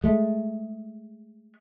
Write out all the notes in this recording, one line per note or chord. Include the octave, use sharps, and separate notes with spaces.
G#3 A3